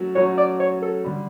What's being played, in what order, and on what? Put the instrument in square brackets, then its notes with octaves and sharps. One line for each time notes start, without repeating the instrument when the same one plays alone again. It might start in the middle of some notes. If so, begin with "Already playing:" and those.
Already playing: [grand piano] F#3 A3 C#4 F#4
[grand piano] F#3 A3 C#4 F#4 [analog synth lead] C#5
[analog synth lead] D5
C#5
A4
[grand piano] D3 G3